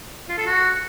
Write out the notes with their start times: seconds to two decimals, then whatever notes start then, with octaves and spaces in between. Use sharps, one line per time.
0.29 F4
0.38 A4
0.47 F#4